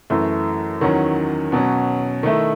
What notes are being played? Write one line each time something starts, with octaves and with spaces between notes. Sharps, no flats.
F#2 E3 A3
E2 D#3 F#3 C#4
B2 F#3 C#4
D#3 A3 E4